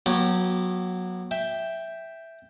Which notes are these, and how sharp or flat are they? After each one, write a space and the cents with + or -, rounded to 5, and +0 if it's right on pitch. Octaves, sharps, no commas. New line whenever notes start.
F#3 -15 B3 -45 G4 -25
E5 +0 G5 +0